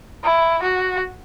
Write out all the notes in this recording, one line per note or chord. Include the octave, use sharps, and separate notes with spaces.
E4
F#4